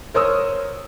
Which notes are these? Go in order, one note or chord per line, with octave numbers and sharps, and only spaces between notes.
A#4 C5 C#5 D#6 E6